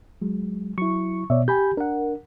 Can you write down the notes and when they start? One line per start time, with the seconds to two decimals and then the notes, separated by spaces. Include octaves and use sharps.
0.22 F#3 G#3
0.78 F#3 E4 C#6
1.30 B2 C#5 D5 E5
1.48 G4 G#5 B5 G6
1.77 D4 A#4 F#5